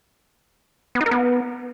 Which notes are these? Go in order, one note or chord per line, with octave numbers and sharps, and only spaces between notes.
B3
D#4
A#4
B3